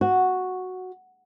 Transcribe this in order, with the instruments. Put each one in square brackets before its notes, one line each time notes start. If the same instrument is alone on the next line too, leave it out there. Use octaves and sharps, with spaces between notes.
[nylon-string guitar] F#4